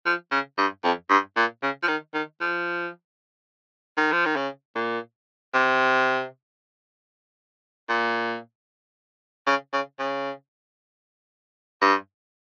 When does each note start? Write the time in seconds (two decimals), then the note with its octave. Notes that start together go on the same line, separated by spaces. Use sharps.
0.06 F3
0.31 C#3
0.58 G2
0.84 F2
1.10 G2
1.36 A#2
1.62 C#3
1.83 F3
1.88 D#3
2.14 D#3
2.41 F3
3.97 D#3
4.12 F3
4.25 D#3
4.36 C#3
4.75 A#2
5.54 C3
7.89 A#2
9.47 C#3
9.73 C#3
9.99 C#3
11.82 G2